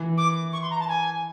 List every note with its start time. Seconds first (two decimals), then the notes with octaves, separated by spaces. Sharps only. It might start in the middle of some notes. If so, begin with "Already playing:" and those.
Already playing: E3
0.17 D6
0.53 C#6
0.62 C6
0.70 A#5
0.79 A5
0.88 G#5